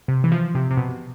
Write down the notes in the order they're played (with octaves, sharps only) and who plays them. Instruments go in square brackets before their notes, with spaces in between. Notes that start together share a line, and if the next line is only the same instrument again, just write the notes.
[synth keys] C3
E3
F3
C3
C3
B2